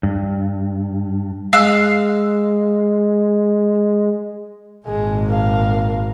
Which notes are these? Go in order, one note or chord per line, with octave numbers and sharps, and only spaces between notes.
G2
G#3 F5 E6 F#6
G#1 A#2 G#3 G#4
A#4 F5